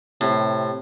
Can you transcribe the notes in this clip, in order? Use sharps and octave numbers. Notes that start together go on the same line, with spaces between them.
A2 C3